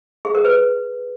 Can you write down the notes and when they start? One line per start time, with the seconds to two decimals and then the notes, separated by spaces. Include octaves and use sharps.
0.25 G#4
0.35 A#4
0.45 B4